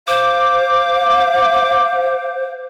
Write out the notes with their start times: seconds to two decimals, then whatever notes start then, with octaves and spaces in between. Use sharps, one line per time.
0.08 C5 F5 D6